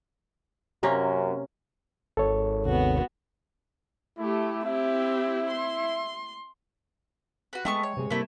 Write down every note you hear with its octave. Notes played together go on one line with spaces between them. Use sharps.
F#2 C3 A#3 C#4
G#1 A4 C#5
D#2 C3 B3 F#4
A3 E4 G4
C4 E4 G4 E5
C6
F#4 B4
G#3 A3 B3 G5 A5 C#6
C#5
C3 G#3
C3 G3 A3 A#3 E4